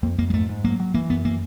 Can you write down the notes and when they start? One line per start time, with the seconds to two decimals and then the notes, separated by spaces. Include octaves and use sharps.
0.03 F2 A#3
0.18 F2 A#3
0.30 G#3
0.34 G#2 A3
0.49 G#2
0.64 F#3 A#3
0.80 F#3
0.94 E3 A#3
1.10 F#2 B3
1.24 E3 A#3